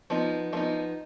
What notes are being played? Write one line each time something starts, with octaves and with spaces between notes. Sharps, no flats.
F3 B3 D#4
F3 B3 D#4 F4